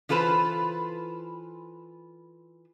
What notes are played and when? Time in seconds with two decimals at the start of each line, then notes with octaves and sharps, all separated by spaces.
0.09 E3 F4 A4 B4 C5